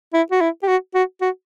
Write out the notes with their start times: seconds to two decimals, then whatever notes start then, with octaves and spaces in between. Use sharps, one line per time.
0.14 E4
0.31 F#4
0.41 E4
0.63 G4
0.68 F#4
0.95 F#4
1.21 F#4